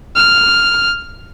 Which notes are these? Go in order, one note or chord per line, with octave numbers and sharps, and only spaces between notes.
F6